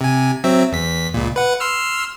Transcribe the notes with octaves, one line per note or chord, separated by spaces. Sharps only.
C3 G#5
F#3 C4 E5
E2 B6
C#2 A#2
B4 F#5
C6 E6 F6